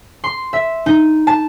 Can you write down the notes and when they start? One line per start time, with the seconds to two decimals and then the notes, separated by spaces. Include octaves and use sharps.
0.24 C6
0.53 E5
0.86 D#4
1.27 A5